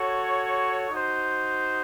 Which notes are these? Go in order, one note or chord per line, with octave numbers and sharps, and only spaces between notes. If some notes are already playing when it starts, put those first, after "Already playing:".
Already playing: F#4 A4 C#5
D#4 F#4 C5